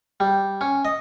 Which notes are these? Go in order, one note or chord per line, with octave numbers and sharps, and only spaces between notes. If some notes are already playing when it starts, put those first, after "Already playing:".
G3
C#4
D#5